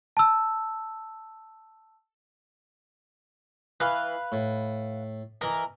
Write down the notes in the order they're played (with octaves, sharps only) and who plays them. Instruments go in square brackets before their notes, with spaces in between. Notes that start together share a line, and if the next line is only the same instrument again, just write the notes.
[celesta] A5 E6
[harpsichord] E3 [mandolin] B4 F5
[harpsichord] A2
[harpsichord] E3 D#5 [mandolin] A#4